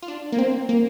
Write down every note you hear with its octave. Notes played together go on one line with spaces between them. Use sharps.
F4
D4
A#3
C4
A#3